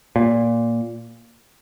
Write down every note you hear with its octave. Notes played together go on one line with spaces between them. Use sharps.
A#2